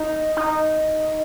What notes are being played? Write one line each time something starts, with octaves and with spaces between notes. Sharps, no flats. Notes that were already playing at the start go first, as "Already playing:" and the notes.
Already playing: D#4
D#4